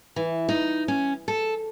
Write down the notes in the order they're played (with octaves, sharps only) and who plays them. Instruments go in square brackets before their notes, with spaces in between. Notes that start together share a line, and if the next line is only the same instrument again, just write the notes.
[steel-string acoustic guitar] E3
D#4
C#4
A4